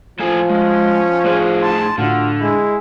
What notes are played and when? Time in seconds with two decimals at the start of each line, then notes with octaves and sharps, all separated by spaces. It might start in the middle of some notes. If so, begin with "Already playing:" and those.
0.20 A2 F3 A4 G#5
0.49 G#3 C#4
1.24 A2 G#4 C5 D5 F#6
1.62 A5 C6
1.98 A2 D3 D4 F4 F#4
2.40 G#3 E4